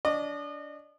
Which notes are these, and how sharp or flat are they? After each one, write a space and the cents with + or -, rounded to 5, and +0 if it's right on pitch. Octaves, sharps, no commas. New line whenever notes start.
D4 -25 D#5 -35